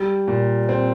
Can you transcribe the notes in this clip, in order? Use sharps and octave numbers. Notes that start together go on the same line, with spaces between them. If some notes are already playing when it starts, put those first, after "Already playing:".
Already playing: G3
A#2
C4